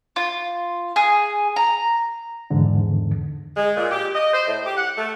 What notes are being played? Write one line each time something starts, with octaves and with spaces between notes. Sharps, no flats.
F4
G#4
A#5
E2 G#2 D3
G#3
A#2
G4
D#5
C5
A2
G4
F#5
A3